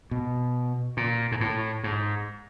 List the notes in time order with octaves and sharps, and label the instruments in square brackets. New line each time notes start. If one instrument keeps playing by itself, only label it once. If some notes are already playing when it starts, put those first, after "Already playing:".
[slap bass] B2
A#2
G#2
A2
G#2